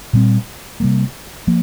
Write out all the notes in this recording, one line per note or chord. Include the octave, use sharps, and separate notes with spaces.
A#2 G3 C4
C3 G3 A#3
F3 A#3